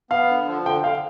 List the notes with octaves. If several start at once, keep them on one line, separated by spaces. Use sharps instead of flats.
B3 F5
D3
F3
D3 G5
D3 F5